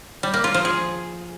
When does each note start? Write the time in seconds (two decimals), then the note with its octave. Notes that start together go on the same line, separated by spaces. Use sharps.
0.23 G3
0.34 A#3
0.44 F4
0.54 F3
0.65 G#4